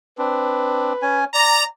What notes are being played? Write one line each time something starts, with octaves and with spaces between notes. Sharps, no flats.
C4 D4 B4
C#4 G#5
D5 A#5